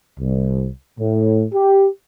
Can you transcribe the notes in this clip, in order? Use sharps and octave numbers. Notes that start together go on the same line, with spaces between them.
C2
A2
G4